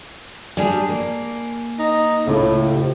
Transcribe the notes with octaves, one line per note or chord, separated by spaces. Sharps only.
G3 D4 G#4 G#5
A#3
D#4
C#2 A2
G4 C5